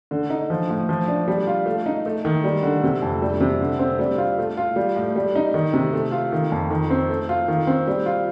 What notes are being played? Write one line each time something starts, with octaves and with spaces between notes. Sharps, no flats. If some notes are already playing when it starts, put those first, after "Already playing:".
D3
D#4
F3
A2
F3
D4
G3
F4
A3
D#4
A3
D#3
G3
D3
C3
F2
G3
C3
D3
C4
G3
F4
A3
F4
G3
A2
G3
D#4
D#3
C3
A3
F4
D#3
F2
D#3
C4
A3
F4
D#3
C4
G3
F4